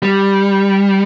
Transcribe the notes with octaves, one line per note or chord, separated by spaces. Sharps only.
G3